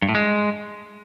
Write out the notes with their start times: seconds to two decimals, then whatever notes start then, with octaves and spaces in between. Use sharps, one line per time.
0.02 G2
0.09 A2
0.15 G#3